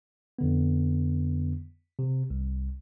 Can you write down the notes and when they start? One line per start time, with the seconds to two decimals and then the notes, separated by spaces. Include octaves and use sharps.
0.39 F2 D3 B3
1.99 C3
2.30 C2